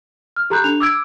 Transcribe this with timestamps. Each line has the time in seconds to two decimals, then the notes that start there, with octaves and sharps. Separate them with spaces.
0.36 F6
0.50 G4 A4 A#5 B5 F#6 G6
0.64 D4 F7
0.80 D6 E6 G#6 D7